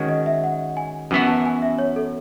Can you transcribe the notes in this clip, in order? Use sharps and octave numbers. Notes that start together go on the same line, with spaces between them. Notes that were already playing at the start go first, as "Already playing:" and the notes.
Already playing: D#3 G#3 C#4 F#4
D#5
E5
F#5
G#5
F#2 E3 B3 F#4 G#5
A5
G#5
E5
C#5
A4